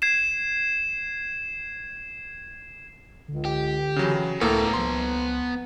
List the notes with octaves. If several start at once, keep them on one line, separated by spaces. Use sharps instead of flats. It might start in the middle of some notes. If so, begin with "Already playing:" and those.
G#6 C7 E7
C#2 D3
G4
C#3 E3 F#3
C#2 A2 A#3 B3 A4 A#5
C#2 F3 C6